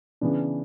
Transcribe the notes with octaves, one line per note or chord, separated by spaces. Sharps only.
C#3 E3 B3 D4